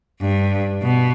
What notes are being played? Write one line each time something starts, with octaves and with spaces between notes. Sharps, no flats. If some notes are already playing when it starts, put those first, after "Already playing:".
G2
B2